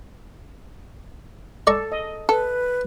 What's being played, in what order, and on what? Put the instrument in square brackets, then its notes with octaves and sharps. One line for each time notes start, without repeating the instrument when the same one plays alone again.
[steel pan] A4 [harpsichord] D5 A#5 C#6
[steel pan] D#5
[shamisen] A4 [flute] B4